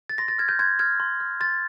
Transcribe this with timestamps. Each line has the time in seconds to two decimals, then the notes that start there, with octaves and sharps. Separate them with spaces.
0.09 A6
0.18 C6 A#6
0.28 A6
0.38 F6 G#6
0.49 G6
0.59 C6 G#6
0.79 F6 G#6
1.00 C6
1.20 F6
1.40 C6 A6